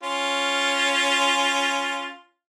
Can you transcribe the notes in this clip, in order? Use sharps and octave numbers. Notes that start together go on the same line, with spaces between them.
C#4 F4